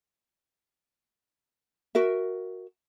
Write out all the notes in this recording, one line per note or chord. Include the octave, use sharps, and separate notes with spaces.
F#4 A#4 E5